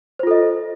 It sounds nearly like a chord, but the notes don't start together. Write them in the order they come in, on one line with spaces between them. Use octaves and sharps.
C5 F4 A4 D#5